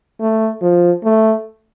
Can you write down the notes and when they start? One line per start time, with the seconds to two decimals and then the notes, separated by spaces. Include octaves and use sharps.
0.20 A3
0.62 F3
1.04 A3